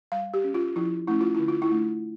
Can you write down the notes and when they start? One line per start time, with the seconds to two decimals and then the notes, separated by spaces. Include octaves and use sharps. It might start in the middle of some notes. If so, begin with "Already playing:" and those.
0.12 G3 F5
0.34 G4
0.44 C#4
0.54 F4
0.76 F3 E4
1.08 A3 C#4 E4
1.21 F4
1.35 D3 E4
1.48 F4
1.62 E4
1.71 A3 D4